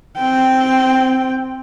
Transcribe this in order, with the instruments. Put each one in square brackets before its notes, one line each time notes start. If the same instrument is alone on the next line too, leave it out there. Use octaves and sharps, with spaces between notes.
[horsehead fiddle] C4 G5